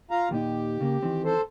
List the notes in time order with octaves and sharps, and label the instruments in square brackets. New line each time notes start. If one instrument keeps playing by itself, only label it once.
[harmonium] F4 F5 A#5
[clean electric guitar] D#2 A#2 D#4 [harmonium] G4
[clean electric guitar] C#3 A#3
D#3 E3 C4
[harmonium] A4 C5